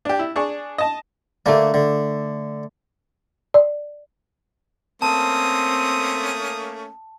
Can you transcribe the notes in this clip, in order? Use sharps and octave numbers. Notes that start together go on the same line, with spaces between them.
D4 G4
E4
D4 G#4 C#6
D#5 A5
D3 A3 A#3 D4
D3
D5
A3 A#3 C4 C#4 A5 D#6